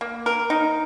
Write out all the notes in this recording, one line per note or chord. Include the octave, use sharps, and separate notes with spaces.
A#3
A#4
D#4